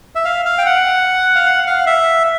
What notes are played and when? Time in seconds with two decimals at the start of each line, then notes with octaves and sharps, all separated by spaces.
0.15 E5
0.25 F5
0.45 F5
0.58 G5
0.66 F#5
1.35 F5
1.46 F#5
1.67 F5
1.87 E5